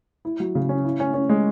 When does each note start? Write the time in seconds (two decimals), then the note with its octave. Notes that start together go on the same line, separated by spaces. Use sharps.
0.25 E4
0.40 F#3
0.55 C#3
0.69 C#4
0.84 E4
1.00 C#4
1.14 C#4
1.29 G#3